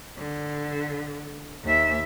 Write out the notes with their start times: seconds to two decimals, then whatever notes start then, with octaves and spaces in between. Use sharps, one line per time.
0.17 D3
1.64 D#2 E5